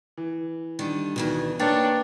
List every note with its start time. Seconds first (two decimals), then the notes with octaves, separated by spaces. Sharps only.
0.17 E3
0.79 D3 D#3 G3
1.16 D2 B2 D#3 E3
1.59 A#3 D4 B4 C#5 G5 A6